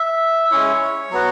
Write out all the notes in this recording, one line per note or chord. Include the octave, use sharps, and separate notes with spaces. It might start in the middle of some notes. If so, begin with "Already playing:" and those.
Already playing: E5
G#3 C#4 E4 C#5
F#3 B3 F#4